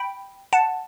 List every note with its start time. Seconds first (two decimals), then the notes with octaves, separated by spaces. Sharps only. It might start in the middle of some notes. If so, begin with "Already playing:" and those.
Already playing: G5 B5
0.53 F#5 A5